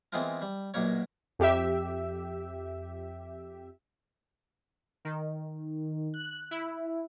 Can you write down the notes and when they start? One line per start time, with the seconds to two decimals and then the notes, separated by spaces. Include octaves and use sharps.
0.12 E3 G#3 B3 C4 F4 A#4
0.42 G3
0.74 B1 F#2 A#2 A#3 A#4 C#5
1.39 F2 G4 E5
5.05 D#3
6.14 F#6
6.51 E4